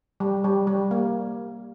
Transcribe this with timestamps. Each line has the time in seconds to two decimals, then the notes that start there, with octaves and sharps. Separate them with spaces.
0.20 G3
0.44 G3
0.67 G3
0.91 A#3